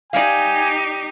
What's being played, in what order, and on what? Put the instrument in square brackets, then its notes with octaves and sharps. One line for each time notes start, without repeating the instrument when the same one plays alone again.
[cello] D#4 G4 [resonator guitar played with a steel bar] D5 F5 [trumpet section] G#5